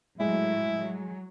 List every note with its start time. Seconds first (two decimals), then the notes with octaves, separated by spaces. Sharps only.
0.20 A2 F#3 G#3 E4
0.80 F#3